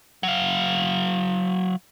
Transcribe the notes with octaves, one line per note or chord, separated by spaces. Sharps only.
F#3 F5